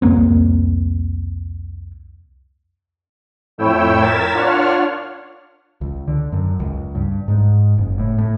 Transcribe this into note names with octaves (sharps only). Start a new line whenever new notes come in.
C2 F2 A#3 C4
F2 A2 E4 C#5 G5 E6
A#4 G#6 A6 B6 E7
D4 F4 C#5 F#5 F6
C#2
D3
F#2
C#2
G2
G#2
F#1
A2
A2